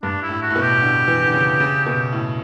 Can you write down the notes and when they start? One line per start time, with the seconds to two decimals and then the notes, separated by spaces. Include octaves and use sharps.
0.03 G2 D4
0.23 E4
0.29 A2
0.42 F#4
0.50 A2
0.56 B2
0.62 G4
0.82 D3
1.08 E3
1.27 D3
1.34 C#3
1.60 C#3
1.86 B2
2.12 A2